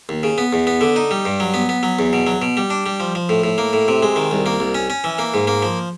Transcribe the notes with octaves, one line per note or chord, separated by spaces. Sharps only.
D#2
C#3
B3
E2
B3
D3
D#4
G3
G2
F#3
B3
B3
F#3
E2
B2
F#3
B2
G3
D4
G3
F3
F3
A2
A2
A#3
A2
C3
G#3
D#3
C2
A#3
C2
C#4
C#4
E3
A#3
G#2
A#3
F3